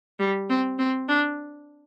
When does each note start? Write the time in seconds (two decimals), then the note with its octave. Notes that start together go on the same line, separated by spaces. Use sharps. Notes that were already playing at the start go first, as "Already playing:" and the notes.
0.20 G3
0.49 C4
0.78 C4
1.09 D4